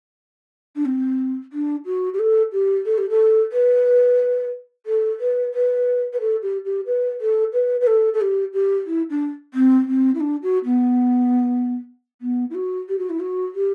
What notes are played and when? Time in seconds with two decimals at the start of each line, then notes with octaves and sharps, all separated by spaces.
0.75 D4
0.85 C4
1.52 D4
1.85 F#4
2.14 G4
2.19 A4
2.52 G4
2.85 A4
2.98 G4
3.09 A4
3.52 B4
4.86 A4
5.20 B4
5.54 B4
6.13 B4
6.20 A4
6.42 G4
6.65 G4
6.86 B4
7.21 A4
7.53 B4
7.81 B4
7.87 A4
8.13 A4
8.21 G4
8.53 G4
8.87 E4
9.10 D4
9.54 C4
9.87 C4
10.14 E4
10.20 D4
10.43 F#4
10.65 B3
12.21 B3
12.50 E4
12.55 F#4
12.89 G4
12.99 F#4
13.10 E4
13.20 F#4
13.55 G4